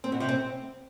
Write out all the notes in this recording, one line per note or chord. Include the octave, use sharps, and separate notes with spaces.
C4
B2
C3
C4